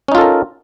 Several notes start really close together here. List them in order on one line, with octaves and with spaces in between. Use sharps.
C#4 D#4 F4 A4 A#4